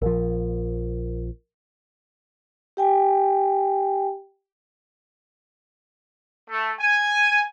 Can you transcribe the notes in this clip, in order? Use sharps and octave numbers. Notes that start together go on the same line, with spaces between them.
A#1 F3 A#4
G4 G5 G#5
A3
G#5